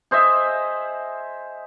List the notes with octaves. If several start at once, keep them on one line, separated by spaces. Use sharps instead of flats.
G#4 C5 D#5 E5